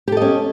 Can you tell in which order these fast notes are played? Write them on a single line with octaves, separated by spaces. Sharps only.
G4 A4 D#5 C#4